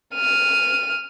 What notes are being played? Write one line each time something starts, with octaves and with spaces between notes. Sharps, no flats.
F6 D#7